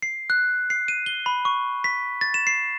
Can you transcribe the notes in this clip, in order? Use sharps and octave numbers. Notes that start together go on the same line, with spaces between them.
C7
F#6
C7
D#7
G7
B5
C#6
B6
A6
E7
C7